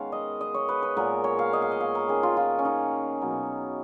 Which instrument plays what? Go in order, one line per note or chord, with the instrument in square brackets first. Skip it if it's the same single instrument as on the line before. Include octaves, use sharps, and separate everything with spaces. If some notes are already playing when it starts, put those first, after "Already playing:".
Already playing: [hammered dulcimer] D#3 G#3 B3 C#4 C#5 F5
D#5
D#5
C#5
B4
B4
A#2 G#3 B3 A#4
C#5
F5
D#5
F5
D#5
F5
A#4
D#3 A#3 C#4 G#4
F4
F4
C#4
D#4
B2 F#3 B3